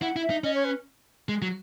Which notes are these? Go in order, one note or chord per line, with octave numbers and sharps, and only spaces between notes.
E4 F#5
E4
E5
D#4
C#4 D#5
C#5
B4
G#3
F#3